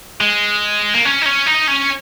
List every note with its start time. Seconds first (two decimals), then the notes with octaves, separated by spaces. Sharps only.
0.21 G#3
0.94 A#3
1.05 C#4
1.22 D#4
1.26 C#4
1.47 D#4
1.68 C#4